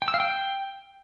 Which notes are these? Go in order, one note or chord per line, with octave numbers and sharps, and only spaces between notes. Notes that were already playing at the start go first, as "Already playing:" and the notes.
G5
E6
F5
G5